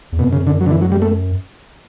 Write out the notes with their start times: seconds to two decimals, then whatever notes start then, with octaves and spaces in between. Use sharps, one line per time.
0.12 E2
0.19 F#2 B2
0.33 C#3
0.47 D3
0.61 F#3
0.66 D3
0.71 E3
0.81 F#3
0.92 G3
1.02 A3